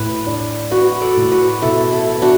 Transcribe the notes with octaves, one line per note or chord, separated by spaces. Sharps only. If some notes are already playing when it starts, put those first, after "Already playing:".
Already playing: A2 B4
D4
D4 F#4 B4
A4 D5
A2
F#4 B4
B2 E4 A4
E4 A4
B3
D4 F#4